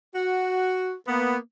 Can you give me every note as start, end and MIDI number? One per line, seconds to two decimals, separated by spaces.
0.15 0.95 66
1.06 1.35 58
1.06 1.35 59